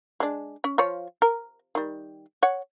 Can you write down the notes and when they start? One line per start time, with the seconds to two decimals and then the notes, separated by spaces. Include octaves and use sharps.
0.20 G#3 D4
0.64 C#4
0.78 F3 F4 C#5
1.22 A#4
1.75 D#3 G3
2.43 C#5 F#5